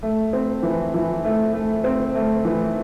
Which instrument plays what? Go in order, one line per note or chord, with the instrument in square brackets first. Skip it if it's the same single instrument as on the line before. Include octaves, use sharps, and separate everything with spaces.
[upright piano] A3
C4
E3
E3
A3
A3
C4
A3
E3